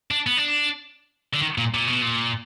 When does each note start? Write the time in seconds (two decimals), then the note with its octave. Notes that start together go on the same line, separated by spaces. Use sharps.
0.11 D4
0.27 B3
0.37 D4
1.33 D3
1.41 D#3
1.58 A#2
1.75 A#2
1.88 B2
2.02 A#2